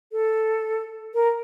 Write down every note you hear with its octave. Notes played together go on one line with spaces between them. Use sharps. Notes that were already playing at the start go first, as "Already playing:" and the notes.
A4
A#4